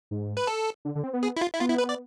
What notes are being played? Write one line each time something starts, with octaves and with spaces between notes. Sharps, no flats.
G#2
B4
A4
D3
D3
C4
B3
G#4
E4
F4
E4
B3 F4
E4
B4
D5